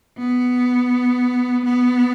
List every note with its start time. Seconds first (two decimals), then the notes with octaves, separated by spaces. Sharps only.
0.19 B3
1.65 B3